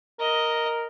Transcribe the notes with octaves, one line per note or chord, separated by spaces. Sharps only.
A#4 D#5